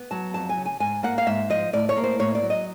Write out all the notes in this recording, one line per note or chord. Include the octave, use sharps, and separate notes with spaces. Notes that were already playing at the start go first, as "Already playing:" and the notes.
Already playing: B3
F#3 A5
F2 A5
G#5
C#3
G#5
G#2 G#5
A#3 F#5
F5
G#2 E5
F3 D#5
A2 D5
C#5
A#3
C5
A2 C#5
D5
F#3
D#5